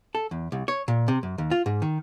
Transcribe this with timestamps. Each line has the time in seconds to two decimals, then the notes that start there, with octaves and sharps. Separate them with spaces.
0.15 A4
0.31 E2
0.52 C2
0.68 C#5
0.88 A#2
1.08 C3
1.23 F#2
1.38 D#2
1.51 F4
1.66 G#2
1.82 D#3